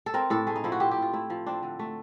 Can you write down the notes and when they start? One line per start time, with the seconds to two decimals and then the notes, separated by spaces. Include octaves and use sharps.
0.06 A4
0.14 C4 A#4
0.30 A2 A4
0.47 A3 G#4
0.56 D#4
0.64 F3 E4
0.72 F#4
0.80 C4 G4
0.91 G4
0.96 A2
1.02 F4
1.13 A3 E4
1.30 F3
1.46 C4 D4
1.63 D3
1.79 A3